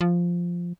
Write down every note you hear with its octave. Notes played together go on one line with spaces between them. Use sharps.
F3